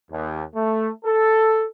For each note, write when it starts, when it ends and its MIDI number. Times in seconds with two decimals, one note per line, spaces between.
0.11 0.44 39
0.55 0.91 57
1.05 1.66 69